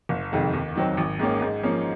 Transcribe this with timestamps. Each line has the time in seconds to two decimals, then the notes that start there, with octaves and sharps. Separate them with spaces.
0.09 F#1
0.32 F2 C3 D#3 G#3
0.53 D#2
0.76 D#3 F#3 C4
0.97 G#1
1.19 G#2 D#3 A#3 C#4
1.42 G#2
1.63 F3 A#3 C#4